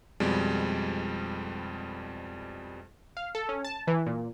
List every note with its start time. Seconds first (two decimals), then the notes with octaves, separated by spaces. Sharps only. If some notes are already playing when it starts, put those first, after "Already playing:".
0.20 F2 B2 G3 G#3
3.17 F5
3.35 A4
3.49 C#4
3.65 A5
3.87 E3
4.06 A#2